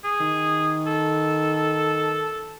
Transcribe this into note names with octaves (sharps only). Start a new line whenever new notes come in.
G#4
D#3
A4